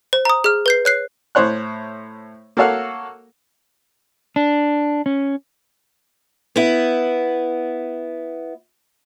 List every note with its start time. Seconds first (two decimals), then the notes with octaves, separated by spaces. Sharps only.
0.13 C5
0.25 A#5 D#6
0.44 G#4 F6
0.66 B4 G6 C7
0.85 C#5 F#6 C7
1.35 A2 C5 C#5 F#6
2.57 A#3 F#4 A4 C#5 F5 F#5
4.36 D4
5.06 C#4
6.56 B3 E4